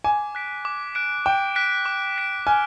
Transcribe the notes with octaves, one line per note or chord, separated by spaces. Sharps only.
G#5 D6
F#6 B6 D7
D6
F#6 B6 D7
G5 D6
F#6 B6 D7
D6
F#6 B6 D7
G#5 F6